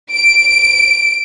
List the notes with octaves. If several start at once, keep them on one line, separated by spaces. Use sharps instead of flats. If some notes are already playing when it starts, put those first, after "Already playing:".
D7